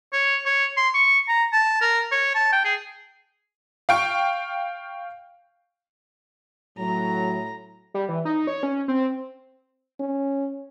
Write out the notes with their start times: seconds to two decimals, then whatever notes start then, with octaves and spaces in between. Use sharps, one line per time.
0.13 C#5
0.46 C#5
0.77 C6
0.95 C#6
1.28 A#5
1.53 A5
1.81 A#4
2.12 C#5
2.35 A5
2.52 G5
2.65 G#4
3.89 F5 G5 C#6
6.78 A2 F#3 A#5
7.94 G3
8.09 E3
8.25 D#4
8.47 C#5
8.63 C#4
8.88 C4
10.00 C#4